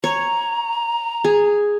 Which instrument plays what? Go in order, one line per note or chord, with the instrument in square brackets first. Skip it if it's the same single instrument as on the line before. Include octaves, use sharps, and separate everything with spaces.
[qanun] C#5 [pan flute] A#5
[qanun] G#4